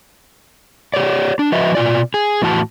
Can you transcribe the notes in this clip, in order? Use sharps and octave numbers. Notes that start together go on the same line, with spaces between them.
G4 C#5 D5
D4
F3 F#4 B4 D#5 E5
B2 F4 D5
G#4
E2 A2 E3 F#4 A5